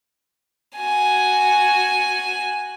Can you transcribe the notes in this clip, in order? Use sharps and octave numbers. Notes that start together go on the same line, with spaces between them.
F#4 G#5